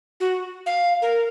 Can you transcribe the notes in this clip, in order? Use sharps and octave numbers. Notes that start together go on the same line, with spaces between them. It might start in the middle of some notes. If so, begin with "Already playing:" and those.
F#4
F5
A#4